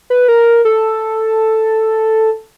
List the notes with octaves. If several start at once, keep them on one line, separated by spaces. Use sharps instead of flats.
B4
A#4
A4